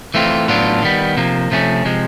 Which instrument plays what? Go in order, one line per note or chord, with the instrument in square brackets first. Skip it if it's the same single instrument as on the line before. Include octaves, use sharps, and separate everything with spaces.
[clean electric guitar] E3 A3 C4 F4
A2 F#3 B3 D4 F4
D#3 G3 B3
C3 F3 A#3
C3 F3 A3 C#4
C3 F3 G#3